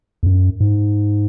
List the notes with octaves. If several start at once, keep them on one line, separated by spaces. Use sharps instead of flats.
E2
F#2
G#2